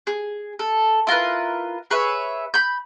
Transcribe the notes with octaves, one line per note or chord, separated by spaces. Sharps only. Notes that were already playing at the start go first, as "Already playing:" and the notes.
G#4
A4
E4 F4 A#4 B4
G#4 B4 C#5 E5
B5 G6